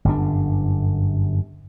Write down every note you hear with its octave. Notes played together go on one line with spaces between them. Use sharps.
G1 F#2 D4